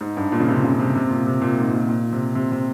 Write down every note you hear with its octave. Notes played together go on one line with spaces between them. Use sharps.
G#2
G2
A#2
C#3
C3
C#3
C3
C3
A#2
C3
A#2
G#2
A#2
A#2
C3
C3
C3